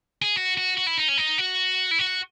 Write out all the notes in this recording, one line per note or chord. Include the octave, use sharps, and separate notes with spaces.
G#4
F#4
F#4
F#4
E4
D#4
C#4
D#4
F#4
E4
F#4